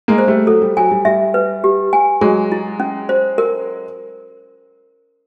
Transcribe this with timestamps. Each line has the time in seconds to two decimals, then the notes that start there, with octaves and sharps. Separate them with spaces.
0.08 G#3 A#3
0.18 C5
0.27 G3 A3
0.47 F#3 A4
0.62 G3
0.77 F#3 G#5
0.91 G3
1.05 G3 E5
1.34 B4
1.64 G4
1.93 G#5
2.21 F#3 G#3 G#4
2.52 E4
2.80 C#4
3.09 C5
3.38 A#4